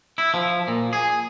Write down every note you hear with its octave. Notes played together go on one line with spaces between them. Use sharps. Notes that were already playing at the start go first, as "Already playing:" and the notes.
E4
F3
A#2
G#4